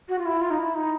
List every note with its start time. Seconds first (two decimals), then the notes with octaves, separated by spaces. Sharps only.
0.09 F#4
0.19 F4
0.26 E4
0.41 F4
0.50 D#4
0.59 E4
0.75 D#4